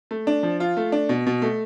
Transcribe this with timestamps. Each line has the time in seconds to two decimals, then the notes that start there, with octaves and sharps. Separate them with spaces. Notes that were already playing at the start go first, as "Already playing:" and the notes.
0.11 A3
0.27 D4
0.43 F3
0.60 F4
0.77 A3
0.92 D4
1.09 B2
1.26 B2
1.42 A3